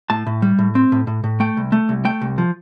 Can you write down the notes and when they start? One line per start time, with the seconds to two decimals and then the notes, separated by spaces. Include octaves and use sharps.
0.10 A2 A5
0.27 A2
0.42 G3
0.59 A2
0.75 C4
0.92 A2
1.07 A2
1.24 A2
1.40 A3 G5
1.57 C2
1.72 A3
1.89 C2
2.05 A3 G5
2.21 C2
2.38 F3